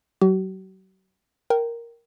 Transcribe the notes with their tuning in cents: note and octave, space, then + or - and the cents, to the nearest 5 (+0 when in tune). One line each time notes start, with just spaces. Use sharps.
F#3 +30 F#4 +45
A#4 +0 G5 -15